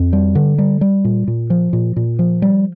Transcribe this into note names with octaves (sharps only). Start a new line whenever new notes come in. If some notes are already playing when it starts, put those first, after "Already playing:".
Already playing: F2
G3
D3
G3
G3
A#2
A#2
F3
A#2
A#2
F3
G3